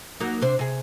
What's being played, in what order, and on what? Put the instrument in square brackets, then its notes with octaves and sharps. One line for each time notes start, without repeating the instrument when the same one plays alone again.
[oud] F#3 A#3 D#4
C3 D4 C5
C3 G#4